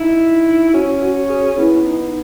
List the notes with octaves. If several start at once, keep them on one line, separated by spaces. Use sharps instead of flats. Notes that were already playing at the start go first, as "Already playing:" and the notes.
Already playing: D#4 E4
C#4 F#4
F#4
G#4
B3 E4
D#4